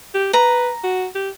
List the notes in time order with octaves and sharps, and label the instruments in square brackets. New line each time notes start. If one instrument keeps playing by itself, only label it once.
[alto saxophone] G4
[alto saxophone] B4 [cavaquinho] A#5
[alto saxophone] F#4
G4